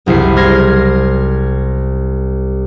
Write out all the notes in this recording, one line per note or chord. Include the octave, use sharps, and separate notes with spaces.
F#1 C2 E4 C7
C6 F6 G#6 A#6 C7